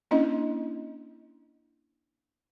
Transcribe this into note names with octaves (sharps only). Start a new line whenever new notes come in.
A#3 C#4 D4 E4 D#5